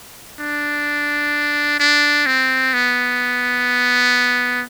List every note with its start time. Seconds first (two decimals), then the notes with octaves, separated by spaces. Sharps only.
0.40 D4
1.79 D4
2.26 C4
2.73 B3